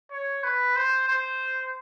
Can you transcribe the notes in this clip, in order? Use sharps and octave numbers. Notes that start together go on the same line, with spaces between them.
C#5
B4
C5
C5